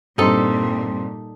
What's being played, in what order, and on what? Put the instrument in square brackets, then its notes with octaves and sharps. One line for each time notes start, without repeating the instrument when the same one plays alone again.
[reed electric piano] G2 C4 C6 [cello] A#2 G3 [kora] D#4 A4